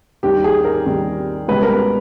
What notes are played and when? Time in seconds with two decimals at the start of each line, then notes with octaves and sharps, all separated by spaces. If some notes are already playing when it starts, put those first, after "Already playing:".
0.23 D#2 D#3 G3 G4
0.44 G#4
0.65 A#4
0.86 D#2 D#3 G3
1.48 C#2 B2 G3 B4
1.63 A#4
1.69 B4